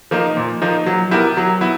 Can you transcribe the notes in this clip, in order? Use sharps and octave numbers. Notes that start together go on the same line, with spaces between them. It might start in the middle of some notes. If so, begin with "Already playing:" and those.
F3 A#3 D#4
A#2
F3 A#3 D#4
F#3
B3 E4 G4 A#4
F#3
B3 E4